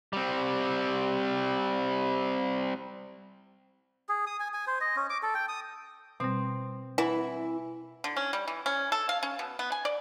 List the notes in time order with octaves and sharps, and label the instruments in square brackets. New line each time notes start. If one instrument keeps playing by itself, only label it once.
[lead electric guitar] G3 C4
[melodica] G#4
D#6
G#5
G#5
C5
D#5
C#4
D6
A4
G5
D#6
[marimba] B2 G3 [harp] C4
[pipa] E3 [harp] E4 B5 [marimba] F#5
[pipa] D3
C#4
G3
E3
C#4
A4
F5
C#4
B2
B3
G#5
D5